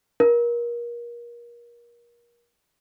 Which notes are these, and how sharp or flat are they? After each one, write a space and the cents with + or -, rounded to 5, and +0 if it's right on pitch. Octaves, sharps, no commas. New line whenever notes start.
A#4 +30